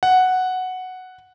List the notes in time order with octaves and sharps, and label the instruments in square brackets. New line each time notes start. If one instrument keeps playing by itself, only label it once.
[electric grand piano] F#5